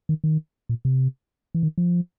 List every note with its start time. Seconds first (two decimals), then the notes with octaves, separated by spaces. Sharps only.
0.09 D#3
0.24 D#3
0.69 A#2
0.85 C3
1.55 E3
1.63 D#3
1.78 F3